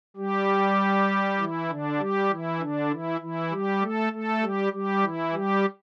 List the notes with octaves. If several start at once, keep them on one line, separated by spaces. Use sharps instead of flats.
G3 G4
E3 E4
D3 D4
G3 G4
E3 E4
D3 D4
E3 E4
E3 E4
G3 G4
A3 A4
A3 A4
G3 G4
G3 G4
E3 E4
G3 G4